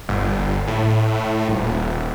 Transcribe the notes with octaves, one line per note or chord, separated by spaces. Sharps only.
G1
A2
D#1